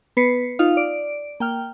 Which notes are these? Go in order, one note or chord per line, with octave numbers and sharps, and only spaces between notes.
B3 B4 C7 C#7
D#4 F4 F5
D5 D7
A#3 G5 F6